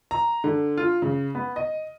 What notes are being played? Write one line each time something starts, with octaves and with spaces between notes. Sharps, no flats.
A#5
D3
F4
C#3
B3
D#5